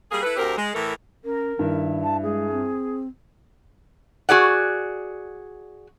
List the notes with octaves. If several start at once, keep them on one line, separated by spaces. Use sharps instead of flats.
G3 A#3 G#4
E4 A4 B4
D2 C4 G4 A#4
G#3
A2 E3 A3 A4 A#4
C#4 A#4
G2 D#3 E4 E5
A5
G#3 G#4
C4
F#4 G#4 D5 F#5